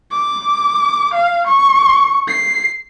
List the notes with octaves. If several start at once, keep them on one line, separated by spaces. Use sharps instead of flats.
D6
F5
C#6
C7